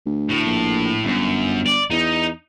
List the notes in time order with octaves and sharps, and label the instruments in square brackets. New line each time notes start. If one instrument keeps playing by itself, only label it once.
[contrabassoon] D2
[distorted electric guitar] A2
[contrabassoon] A#1
[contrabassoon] G1 [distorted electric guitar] F#2
[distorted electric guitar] D5
[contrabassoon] E2 [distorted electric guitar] D#4